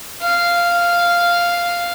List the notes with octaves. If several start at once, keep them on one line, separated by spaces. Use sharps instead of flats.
F5